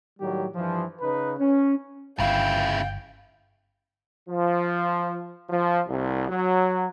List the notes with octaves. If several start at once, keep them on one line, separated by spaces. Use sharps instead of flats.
A2 D#3 F#3 G3 G4
G2 E3 F3
C#3 D#4 B4
C#4
G1 C#3 E4 F5 G5
F3
F3
C2
F#3